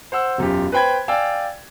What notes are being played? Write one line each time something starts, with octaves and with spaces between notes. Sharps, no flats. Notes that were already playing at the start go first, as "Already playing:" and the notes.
C5 F#5 E6
E1 F#2 F4 G4
B4 C5 G5 B5 G#6
D5 F5 G5 G#5 E6